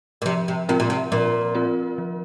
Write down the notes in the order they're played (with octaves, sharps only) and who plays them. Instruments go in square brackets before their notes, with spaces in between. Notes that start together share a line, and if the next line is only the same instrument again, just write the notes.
[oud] A#2
[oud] C3 [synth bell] F3
[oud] C3
[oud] C3 [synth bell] C4 F4 A#4
[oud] A#2
C3
[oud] A#2 [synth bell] F3
[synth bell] C4 F4 A#4
F3